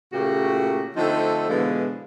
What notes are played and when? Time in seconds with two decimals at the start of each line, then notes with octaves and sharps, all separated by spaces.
0.13 A#2 C#3 A3 A#3 F#4 G4
0.97 D3 F3 A3 C4 D#4 A4
1.49 B2 D3 E3 F3 G#3 B3